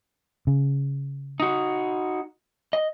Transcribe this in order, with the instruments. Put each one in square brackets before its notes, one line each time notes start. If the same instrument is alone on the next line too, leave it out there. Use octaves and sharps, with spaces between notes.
[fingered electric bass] C#3
[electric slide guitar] D#4 F#4
D#5